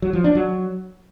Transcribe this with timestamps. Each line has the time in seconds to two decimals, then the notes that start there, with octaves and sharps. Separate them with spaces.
0.02 F#3
0.13 F3
0.24 D4
0.35 F#3